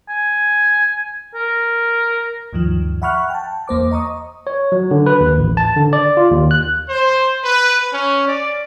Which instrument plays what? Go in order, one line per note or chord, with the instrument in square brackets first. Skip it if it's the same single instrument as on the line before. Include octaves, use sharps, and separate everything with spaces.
[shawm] G#5
A#4
[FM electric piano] D2 G2 D#3 F3
E5 F#5 B5 C#6 F6 F#6
G5 A5
E2 A#3 C5 D6
D#5 A#5 C#6 D#6
[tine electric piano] C#5
F#3
D3
B4
D#2
A1
A5
D3
D5
F4
D#2
F#6
[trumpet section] C5
B4
C#4
D5